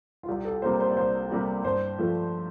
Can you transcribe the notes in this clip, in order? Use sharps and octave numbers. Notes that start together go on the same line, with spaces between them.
F4
C2 G4
A4
C3 G3 A#3 C5
C5
D5
C2 C5
C3 G3 A#3
G2 C5
F3 A3